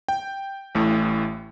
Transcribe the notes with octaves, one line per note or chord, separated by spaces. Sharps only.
G5
A1 A2 A3